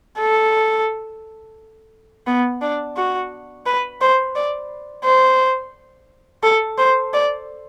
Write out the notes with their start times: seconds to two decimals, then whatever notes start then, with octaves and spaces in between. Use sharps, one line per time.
0.19 A4
2.27 B3
2.62 D4
2.97 F#4
3.66 B4
4.01 C5
4.35 D5
5.04 C5
6.43 A4
6.78 C5
7.14 D5